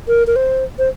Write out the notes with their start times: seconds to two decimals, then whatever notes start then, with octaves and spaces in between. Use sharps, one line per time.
0.08 A#4
0.27 A#4
0.36 C5
0.79 C5